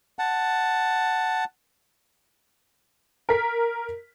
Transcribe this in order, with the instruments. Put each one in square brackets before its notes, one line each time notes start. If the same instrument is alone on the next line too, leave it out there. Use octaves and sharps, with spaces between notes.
[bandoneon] F#5 A5
[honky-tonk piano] A#4 B6